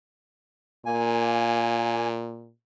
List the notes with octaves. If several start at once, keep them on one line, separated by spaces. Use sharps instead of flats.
A#2 A#3 G#5